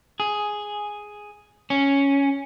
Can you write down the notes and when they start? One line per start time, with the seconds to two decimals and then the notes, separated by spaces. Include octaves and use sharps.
0.20 G#4
1.70 C#4